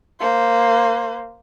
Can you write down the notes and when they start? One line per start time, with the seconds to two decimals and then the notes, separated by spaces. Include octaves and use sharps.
0.20 A#3 C5